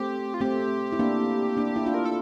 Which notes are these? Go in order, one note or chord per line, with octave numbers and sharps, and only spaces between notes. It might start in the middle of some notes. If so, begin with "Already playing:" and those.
Already playing: A3 C4 G4
F4
A3 C4 G4
E4
A#3 D4
A#3 D4
E4
D4 F4
A#4
A4